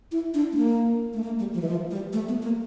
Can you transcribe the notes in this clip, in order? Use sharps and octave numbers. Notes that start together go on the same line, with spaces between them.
E4
D4
A3
A#3
A3
A#3
G3
F3
E3
F3
G3
A3
B3
A#3